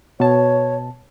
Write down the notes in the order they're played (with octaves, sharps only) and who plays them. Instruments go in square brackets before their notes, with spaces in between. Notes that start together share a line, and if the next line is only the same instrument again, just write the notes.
[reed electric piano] B2 A5 [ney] C#5